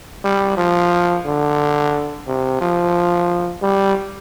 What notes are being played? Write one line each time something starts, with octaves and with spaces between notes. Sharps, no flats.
G3
F3
D3
C3
F3
G3